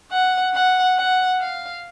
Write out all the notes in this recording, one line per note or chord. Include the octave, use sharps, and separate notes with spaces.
F#5
F#5
F#5
F5